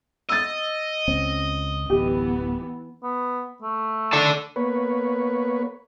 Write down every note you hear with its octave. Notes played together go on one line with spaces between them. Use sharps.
D#5 E6 A6
C#2 C4 C#4
D1 A1 E3 B3 G4
B3
A3
A4 D5 A5
A#3 B3 B4 C#5